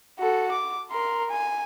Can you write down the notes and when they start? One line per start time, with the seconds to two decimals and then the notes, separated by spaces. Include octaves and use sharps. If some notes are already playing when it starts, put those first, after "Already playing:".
0.20 F#4 A4
0.51 D6
0.91 A#4 C6
1.30 G#5